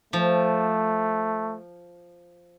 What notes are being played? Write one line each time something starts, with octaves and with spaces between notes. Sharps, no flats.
F3 A3